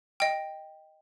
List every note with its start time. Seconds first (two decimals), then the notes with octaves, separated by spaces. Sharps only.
0.20 D#5 G5